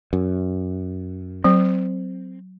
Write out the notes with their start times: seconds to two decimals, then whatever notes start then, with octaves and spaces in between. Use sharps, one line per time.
0.13 F#2
1.44 F#3 C4